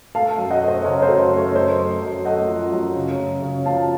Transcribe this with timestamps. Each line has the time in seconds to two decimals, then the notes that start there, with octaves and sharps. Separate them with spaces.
0.15 A3 F5 A5
0.38 F#2
0.51 D#5 F#5
0.62 A3
0.68 C5 D#5
0.85 C#3 A#4 C#5
1.02 A4 C5
1.09 F#2
1.31 A3
1.37 A#4 C#5
1.55 F#2 C5 D#5
1.79 A3
2.02 F#2
2.25 A3 D#5 F#5
2.48 F3
2.72 F#2
2.96 C#3
3.19 C#3
3.42 C#3
3.66 F3 F5 A5